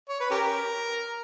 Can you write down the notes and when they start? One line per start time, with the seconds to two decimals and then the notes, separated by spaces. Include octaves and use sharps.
0.09 C#5
0.20 B4
0.31 C#4 G4 A#4